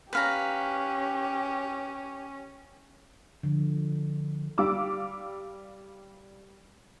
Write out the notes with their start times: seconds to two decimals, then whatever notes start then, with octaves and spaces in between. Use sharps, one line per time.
0.13 C#4 G4 B4 F5 A#5
3.43 D3 F3
4.58 G3 F5 D6 E6